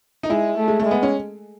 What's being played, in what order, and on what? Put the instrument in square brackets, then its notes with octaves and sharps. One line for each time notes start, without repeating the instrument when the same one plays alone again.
[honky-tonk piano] D#4
[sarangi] G#3 [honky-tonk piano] E4
[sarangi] A3
[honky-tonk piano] G#3
A3
[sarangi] G#3
[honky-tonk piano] B3
C#4